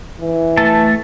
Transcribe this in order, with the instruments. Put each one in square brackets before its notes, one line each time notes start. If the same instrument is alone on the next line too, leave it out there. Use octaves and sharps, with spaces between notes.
[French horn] E3
[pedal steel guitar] A3 A4 A5